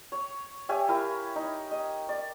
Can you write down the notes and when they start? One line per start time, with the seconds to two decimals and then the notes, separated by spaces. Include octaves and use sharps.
0.12 C#5
0.69 G4 C#5 E5 G#5
0.89 E4 A#4 F5
1.36 D#4
1.71 D#5
2.09 D5